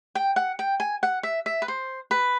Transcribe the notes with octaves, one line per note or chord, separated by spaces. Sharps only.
G5
F#5
G5
G#5
F#5
E5
E5
B4
C5
B4